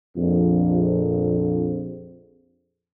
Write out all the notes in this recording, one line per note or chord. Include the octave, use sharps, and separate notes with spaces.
A#1 F2